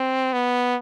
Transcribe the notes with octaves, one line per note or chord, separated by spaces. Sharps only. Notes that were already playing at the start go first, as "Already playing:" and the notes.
Already playing: C4
B3